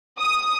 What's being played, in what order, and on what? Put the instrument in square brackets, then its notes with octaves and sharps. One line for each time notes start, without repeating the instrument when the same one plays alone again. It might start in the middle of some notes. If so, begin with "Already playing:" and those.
[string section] D#6